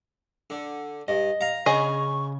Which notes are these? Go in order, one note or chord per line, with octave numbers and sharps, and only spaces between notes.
D3
G2 D#5
F5 A#5
C#3 G#4 C#5 D#5 B5 C#6